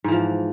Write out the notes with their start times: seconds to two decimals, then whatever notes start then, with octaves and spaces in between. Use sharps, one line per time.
0.04 G#2
0.08 E3
0.12 F3